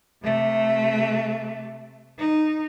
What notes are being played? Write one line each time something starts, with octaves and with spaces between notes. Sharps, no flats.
C3 A3
D#4